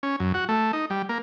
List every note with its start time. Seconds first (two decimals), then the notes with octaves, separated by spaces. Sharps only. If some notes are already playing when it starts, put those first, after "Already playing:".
0.03 C#4
0.20 F#2
0.34 F#4
0.49 A3
0.73 D#4
0.90 G3
1.09 A#3